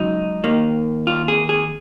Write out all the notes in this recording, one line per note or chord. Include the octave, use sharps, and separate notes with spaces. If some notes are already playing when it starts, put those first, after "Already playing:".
Already playing: C#2 C#3 F#3 D#4
D#2 D#3 A#3
F4
G#4
G#4